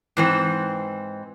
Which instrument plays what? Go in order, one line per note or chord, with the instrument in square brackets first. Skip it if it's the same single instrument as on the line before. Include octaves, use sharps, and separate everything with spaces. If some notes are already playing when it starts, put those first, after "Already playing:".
[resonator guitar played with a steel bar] G#2 E3 C4